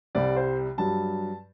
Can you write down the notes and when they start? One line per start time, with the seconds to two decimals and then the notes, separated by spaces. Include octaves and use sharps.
0.15 C2 C3 G3 D5
0.36 C5
0.78 G2 F#3 A5